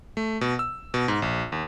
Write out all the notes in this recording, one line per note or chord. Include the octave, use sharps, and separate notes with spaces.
A3
B2
E6
B2
G#2
A#1
D#2